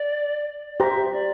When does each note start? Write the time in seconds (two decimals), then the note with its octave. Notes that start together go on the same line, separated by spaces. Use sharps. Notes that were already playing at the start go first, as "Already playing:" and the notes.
Already playing: D5
0.75 D5
0.80 G4 C5 E5 G5 A#5
1.12 D5